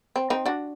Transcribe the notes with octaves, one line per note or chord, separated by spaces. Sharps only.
C4
C4 D#4
D4 F#4